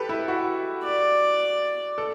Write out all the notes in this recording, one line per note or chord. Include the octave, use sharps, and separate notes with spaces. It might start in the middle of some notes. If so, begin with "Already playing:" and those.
Already playing: G4 A4 B4
E4
F#4
D5
A4